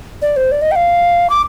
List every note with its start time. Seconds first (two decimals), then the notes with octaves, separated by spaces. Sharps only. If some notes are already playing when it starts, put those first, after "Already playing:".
0.22 D5
0.37 C5
0.52 D5
0.62 D#5
0.71 G5
0.76 F5
1.30 D6